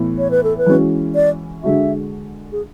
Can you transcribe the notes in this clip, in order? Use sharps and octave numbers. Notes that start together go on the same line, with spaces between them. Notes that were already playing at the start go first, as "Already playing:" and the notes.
Already playing: A2 E3 B3
C#5
B4
A4
B4
E3 G#3 C#4 F#4
D5
D3 G#3 D4 F#4 E5
G#4